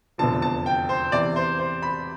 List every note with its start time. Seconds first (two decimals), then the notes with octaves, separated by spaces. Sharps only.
0.18 F1 E2 D3 F3 A5
0.42 A5
0.66 G5
0.89 C5
1.12 E2 C3 E3 D5
1.36 C5
1.58 C5
1.82 B5